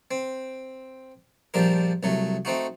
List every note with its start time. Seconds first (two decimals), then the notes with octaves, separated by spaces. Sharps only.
0.11 C4
1.54 A#1 F3 G3 D4 A#4
2.03 C2 F#3 A3
2.45 A3 C4 D#4 F#4